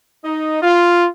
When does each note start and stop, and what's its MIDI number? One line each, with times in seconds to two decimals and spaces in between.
0.25 0.60 63
0.63 1.08 65